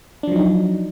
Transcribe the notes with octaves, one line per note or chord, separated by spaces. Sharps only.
F3 F#3 D4 D#4